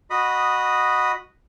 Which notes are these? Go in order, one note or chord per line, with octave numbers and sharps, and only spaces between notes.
F#4 D#5 B5 D#6